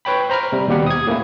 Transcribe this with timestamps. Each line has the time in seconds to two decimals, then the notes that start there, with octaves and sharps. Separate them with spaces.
0.05 B4 C#5 G5 B5
0.30 C5 A#5 B5 F6
0.52 C3 G3
0.68 D#2 B2 G3 G4 F#5
0.86 D#6 G#6
1.07 A2 A#3 C#4 E4